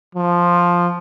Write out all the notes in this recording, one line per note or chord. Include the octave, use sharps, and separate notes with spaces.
F3